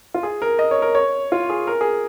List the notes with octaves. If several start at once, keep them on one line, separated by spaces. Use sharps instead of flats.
F4
G#4
A#4
D#5
C#5
A#4
C#5
F4
G#4
A#4
G#4